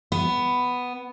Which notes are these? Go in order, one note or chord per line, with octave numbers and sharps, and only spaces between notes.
B3